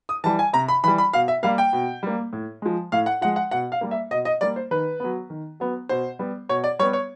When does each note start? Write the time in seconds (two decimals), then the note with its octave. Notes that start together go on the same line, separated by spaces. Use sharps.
0.09 D#6
0.24 E3 G3 A5
0.39 G#5
0.53 C3 A#5
0.68 B5
0.84 E3 G3 B5
0.98 B5
1.13 B2 F5
1.28 E5
1.43 G3 A#3 F5
1.58 G5
1.73 B2
2.03 G3 A#3
2.33 A2
2.62 F3 G#3
2.92 A2 F5
3.06 F#5
3.21 F3 G#3 F#5
3.36 F#5
3.51 B2 F#5
3.72 F5
3.81 G3 A#3
3.91 E5
4.11 B2 D#5
4.25 D#5
4.41 G3 A#3 D5
4.56 C5
4.71 D#3 B4
5.00 F#3 B3
5.30 D#3
5.60 F#3 B3
5.89 B2 C5
6.19 G3 B3
6.49 B2 C#5
6.64 D5
6.79 G3 C#5
6.82 B3
6.93 C#5